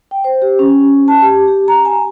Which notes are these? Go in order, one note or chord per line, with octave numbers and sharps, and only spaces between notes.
G5
C5
G4
C#4
A5
G4
G4
A#5
G#5